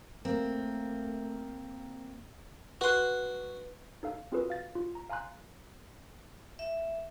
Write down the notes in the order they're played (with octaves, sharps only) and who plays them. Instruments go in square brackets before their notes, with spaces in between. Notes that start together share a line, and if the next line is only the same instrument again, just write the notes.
[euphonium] A3 [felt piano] A#3 [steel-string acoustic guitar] C4
[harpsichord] F#4 C6 [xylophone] B4 F#6
[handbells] D#4 A4 F5
C4 F4 F#4 G#4 A4 B4
F5 A6
F4
A#5
F5 G#5 A#5 C6 F#6
[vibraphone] E5